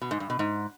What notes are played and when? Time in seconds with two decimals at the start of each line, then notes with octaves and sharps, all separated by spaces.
0.02 B2
0.11 G#2
0.20 G2
0.30 B2
0.39 G#2